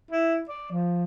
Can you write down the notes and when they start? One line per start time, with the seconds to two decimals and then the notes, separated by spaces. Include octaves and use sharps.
0.11 E4
0.49 D5
0.72 F3